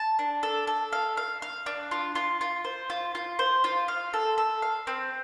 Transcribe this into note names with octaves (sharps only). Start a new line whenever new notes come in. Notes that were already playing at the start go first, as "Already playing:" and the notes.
Already playing: A5
D4
A4
A4
F5
F5
F5
D4
F4
F4
F4
C5
F4
F4
C5
F4
F5
A4
A4
F5
C4